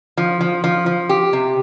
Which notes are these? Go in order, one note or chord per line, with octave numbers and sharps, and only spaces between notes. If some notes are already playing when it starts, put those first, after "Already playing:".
F3
F3
F3
F3
G4
C3